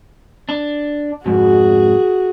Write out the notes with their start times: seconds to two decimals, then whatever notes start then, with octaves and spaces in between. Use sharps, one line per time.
0.49 D4
1.26 F2 G#2 F#4 G#4